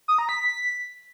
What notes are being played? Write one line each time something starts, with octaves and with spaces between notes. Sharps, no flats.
D#6
A#5
B6